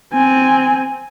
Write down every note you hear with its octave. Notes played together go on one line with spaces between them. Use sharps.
C4 G#5